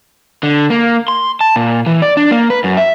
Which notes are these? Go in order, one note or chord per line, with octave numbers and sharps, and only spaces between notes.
D3
A#3
C6
A5
A#2
E3
D5
D4
A#3
B4
F#2
E5